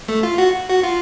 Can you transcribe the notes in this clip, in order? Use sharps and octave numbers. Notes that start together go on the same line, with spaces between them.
A3
F4
F#4
F#4
F4